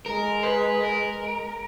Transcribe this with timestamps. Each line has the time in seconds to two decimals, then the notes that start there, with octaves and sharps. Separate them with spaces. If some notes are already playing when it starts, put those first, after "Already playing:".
0.06 G#3 A#4
0.43 B4
0.81 A#4